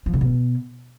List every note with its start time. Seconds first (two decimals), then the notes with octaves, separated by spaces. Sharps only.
0.06 F3
0.13 C3
0.21 B2